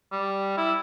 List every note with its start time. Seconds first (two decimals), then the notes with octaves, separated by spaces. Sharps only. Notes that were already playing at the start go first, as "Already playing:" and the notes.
0.12 G3
0.57 E4